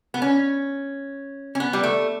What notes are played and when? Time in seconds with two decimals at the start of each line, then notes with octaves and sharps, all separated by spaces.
0.14 B3
0.22 C#4
1.55 C#4
1.60 B3
1.73 G3
1.83 A3